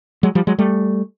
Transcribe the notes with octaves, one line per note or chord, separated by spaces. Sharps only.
F#3 G#3
F3 G3
F#3 G#3
G3 A3